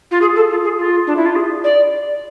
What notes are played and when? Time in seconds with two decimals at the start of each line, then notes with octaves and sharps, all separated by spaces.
0.11 F4
0.21 G#4
0.35 A4
0.50 F4
0.64 G#4
0.79 F4
1.07 D4
1.16 E4
1.26 F4
1.36 G#4
1.64 D5